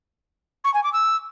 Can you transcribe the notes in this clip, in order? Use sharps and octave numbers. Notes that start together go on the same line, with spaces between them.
C#6
G#5
D6
E6